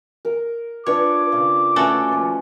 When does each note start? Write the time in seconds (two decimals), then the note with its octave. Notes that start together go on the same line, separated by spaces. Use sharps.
0.25 A#4
0.86 D4 F4 B4 C#5 D6
1.32 C#3
1.76 A3 C#4 F#4 A4 B4
2.08 D#2 F3